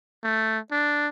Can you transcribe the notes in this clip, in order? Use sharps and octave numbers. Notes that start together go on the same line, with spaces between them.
A3
D4